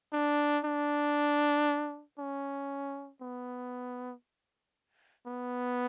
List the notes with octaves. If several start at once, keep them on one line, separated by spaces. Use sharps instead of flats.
D4
D4
C#4
B3
B3